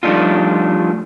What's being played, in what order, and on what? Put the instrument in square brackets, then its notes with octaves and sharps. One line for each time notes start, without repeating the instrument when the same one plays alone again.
[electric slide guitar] F3 G3 A3 D4 D#4 F4